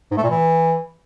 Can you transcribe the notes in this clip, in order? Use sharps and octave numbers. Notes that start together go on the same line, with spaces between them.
G#2
A3
A#2
E3